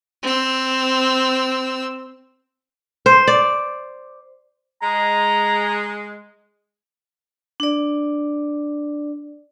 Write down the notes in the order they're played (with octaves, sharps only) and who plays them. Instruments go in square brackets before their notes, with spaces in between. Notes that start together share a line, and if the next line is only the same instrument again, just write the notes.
[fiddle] C4 E6
[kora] C5
D5
[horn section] G#3 [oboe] A#5
[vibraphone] D4 D5